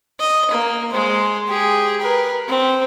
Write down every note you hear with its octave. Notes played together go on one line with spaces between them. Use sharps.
D#5
A#3
G#3 C5
G4 G#4
A#4 B4
C4